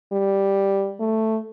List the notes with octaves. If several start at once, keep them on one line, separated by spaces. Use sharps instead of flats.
G3
A3